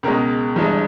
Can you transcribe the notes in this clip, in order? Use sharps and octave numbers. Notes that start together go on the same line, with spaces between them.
C#2 B2 G#3 A#4
G1 G2 E3 G#3